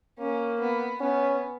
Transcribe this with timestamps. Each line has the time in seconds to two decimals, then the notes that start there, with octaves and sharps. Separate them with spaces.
0.19 A#3 C#4
0.60 B3
1.00 B3 C#4